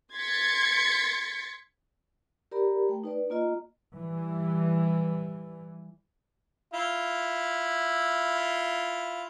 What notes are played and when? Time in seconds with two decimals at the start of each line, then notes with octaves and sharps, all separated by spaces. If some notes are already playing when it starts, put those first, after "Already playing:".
0.15 C6 G#6 A6 B6 C#7
2.51 G4 A#4 D5 A#5 B5
2.89 A3 G5
3.04 D#4 B4 D5
3.30 A#3 F4 D#5 A#5
3.93 E3 G3
6.74 E4 F4